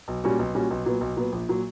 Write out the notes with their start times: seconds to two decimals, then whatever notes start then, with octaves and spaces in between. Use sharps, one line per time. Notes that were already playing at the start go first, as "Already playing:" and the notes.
0.08 B1
0.24 A#2 G3 C#4 F#4
0.39 B1
0.55 A#2 G3 C#4 F#4
0.71 B1
0.85 A#2 F#3 B3
1.01 B1
1.17 A#2 F#3 B3
1.32 A#1
1.49 A#2 F#3